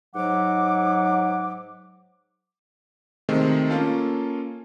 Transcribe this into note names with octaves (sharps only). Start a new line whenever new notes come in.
G#2 F#3 F#5 D6
C3 D#3 G#3 A3 C4
A#3 C#4 F4 A4